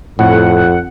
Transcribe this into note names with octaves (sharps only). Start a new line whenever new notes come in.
F2 A2 F#5